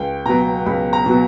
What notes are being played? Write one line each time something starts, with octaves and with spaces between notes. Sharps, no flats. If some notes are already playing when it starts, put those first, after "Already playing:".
Already playing: C#2 G5
B2 F#3 B3 A#5
C#2 B5
A#5
B2 F#3 B3